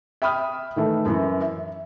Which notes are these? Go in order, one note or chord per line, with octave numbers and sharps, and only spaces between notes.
E5 G5 B5 D#6 F6
D#3 E3 A3
F#2 E3
E5